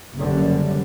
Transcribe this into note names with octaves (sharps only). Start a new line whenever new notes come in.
F#1 F#2 D3 G3